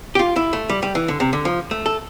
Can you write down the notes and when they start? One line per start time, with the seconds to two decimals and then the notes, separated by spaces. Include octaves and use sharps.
0.15 G4
0.19 F4
0.36 E4
0.53 A3
0.69 G3
0.83 G3
0.95 E3
1.08 D3
1.20 C3
1.33 D3
1.45 F3
1.71 A3
1.86 A4